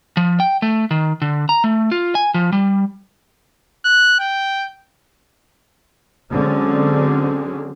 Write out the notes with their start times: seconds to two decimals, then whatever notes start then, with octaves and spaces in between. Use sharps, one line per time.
0.17 F3
0.40 G5
0.62 A3
0.91 D#3
1.22 D3
1.49 A#5
1.64 A3
1.92 F4
2.15 G#5
2.34 F3
2.52 G3
3.85 F#6
4.19 G5
6.29 D3 F#3 G#3 C4 C#4